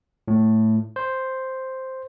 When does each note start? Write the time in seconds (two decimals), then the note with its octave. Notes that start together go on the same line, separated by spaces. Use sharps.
0.28 A2
0.96 C5